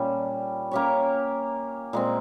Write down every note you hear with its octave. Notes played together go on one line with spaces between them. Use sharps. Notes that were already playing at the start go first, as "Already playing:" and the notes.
Already playing: A#2 G3 C#4
A#3 C#4 G4 C#5
A#2 G#3 C4